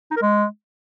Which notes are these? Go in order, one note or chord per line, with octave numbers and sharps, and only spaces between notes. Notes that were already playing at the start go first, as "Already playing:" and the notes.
D#4
A#4
G#3